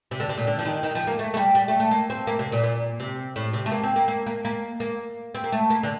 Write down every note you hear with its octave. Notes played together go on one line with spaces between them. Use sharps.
C3
D3
C3
A#2
D3
F3
D#3
D#3
F3
A#3
A3
A3
G3
G3
A3
A3
A#3
C4
A#3
C3
A#2
A#2
C3
A2
C3
A3
A#3
C4
A#3
A#3
A#3
A#3
A#3
C4
A#3
A3
A#3
D3